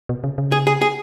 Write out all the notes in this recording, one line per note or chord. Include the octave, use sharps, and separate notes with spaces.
B2
C#3
C#3
G#4
G#4
G#4